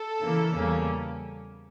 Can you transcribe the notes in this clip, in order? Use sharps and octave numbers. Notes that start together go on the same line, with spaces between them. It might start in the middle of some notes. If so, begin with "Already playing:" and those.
Already playing: A4
C#3 E3 A#3
E2 C#3 G3 A#3 C#4